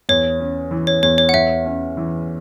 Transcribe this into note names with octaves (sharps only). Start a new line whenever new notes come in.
E2 C#5
C#4
E3
C#5
E2 C#5
C#5
F#5
E2 E5
C#4
E3